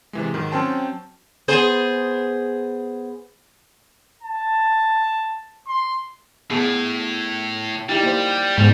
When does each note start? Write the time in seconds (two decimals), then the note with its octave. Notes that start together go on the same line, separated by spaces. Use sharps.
0.13 C3 E3 G#3
0.34 G#2 D#3 F#3
0.51 F#3 C4 C#4 G5 A5 C6
1.48 B3 G#4 C5
4.23 A5
5.67 C6
6.50 A2 B3 G#4 A5
7.89 G3 D#4 E4 G4
8.03 A#3 C5
8.58 G#2 G3 G#3 B3 G#5